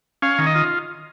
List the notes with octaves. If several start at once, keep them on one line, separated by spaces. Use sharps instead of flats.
C#4 F5
D#3
D#5
F4